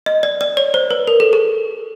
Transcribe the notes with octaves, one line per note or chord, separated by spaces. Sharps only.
D#5
D5
D5
C#5
C5
B4
A#4
A4
G#4